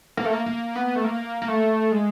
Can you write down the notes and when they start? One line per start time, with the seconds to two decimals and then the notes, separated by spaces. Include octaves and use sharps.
0.17 A#3
0.25 A3
0.33 A#3
0.46 A#3
0.75 B3
0.96 A3
1.04 A#3
1.42 A#3
1.48 A3
1.91 G#3